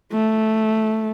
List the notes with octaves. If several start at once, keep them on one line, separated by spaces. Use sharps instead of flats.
A3